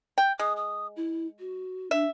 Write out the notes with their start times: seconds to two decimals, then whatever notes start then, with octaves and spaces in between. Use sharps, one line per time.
0.18 G5
0.39 G#3 D#6
0.57 D#6
0.97 E4
1.39 F#4
1.91 D4 E5